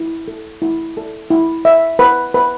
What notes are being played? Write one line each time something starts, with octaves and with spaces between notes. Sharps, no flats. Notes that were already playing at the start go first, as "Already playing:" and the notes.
Already playing: E4
A4
E4
A4
E4
E5
B4
B4